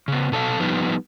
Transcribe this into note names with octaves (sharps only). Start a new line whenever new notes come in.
C#3 B3
B2 A4 C#5 F5
F3 G3 B3 D#4